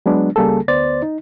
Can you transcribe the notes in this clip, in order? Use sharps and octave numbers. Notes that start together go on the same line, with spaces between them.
F#3 G#3 B3 D4
C#2 C#3 G3 A#3 G#4 A4
D2 B3 C5 D5 A6
D#4